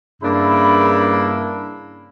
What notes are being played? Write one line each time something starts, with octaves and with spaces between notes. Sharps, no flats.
G2 C#3 A#3 D4 E4 B5